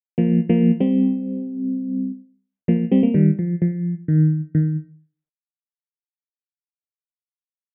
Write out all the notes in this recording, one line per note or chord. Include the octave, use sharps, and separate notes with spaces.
F3 A#3
F3 A#3
G3 C4
F3 A#3
G3 C4
A#3
D#3 G3
F3
F3
D#3
D#3